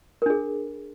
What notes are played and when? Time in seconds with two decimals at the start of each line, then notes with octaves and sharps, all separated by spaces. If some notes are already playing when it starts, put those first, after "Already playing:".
0.22 A#4
0.26 D4
0.30 G#4